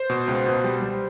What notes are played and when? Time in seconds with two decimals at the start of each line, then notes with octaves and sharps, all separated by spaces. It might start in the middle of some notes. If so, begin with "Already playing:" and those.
Already playing: C5
0.10 B2
0.28 C#2
0.46 B2
0.64 G3
0.82 G3